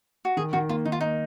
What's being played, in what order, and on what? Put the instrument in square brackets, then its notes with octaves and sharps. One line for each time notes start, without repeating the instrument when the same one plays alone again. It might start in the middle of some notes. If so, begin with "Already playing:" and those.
[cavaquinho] F#4
[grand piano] D#3 [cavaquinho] G#4
[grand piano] D#3 [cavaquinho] F#4
[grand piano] A#3 [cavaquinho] F4
[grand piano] D#3 [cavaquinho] D#4
[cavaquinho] F4
[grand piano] A#3 [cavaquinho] D#4